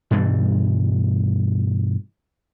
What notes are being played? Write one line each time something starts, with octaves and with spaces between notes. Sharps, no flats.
G2 B2 E3 G3